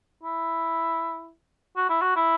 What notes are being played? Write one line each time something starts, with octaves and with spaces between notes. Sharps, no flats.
E4
F#4
E4
F#4
E4